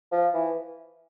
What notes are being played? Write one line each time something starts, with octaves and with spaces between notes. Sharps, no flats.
F3
E3